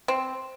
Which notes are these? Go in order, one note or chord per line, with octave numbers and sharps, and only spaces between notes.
C4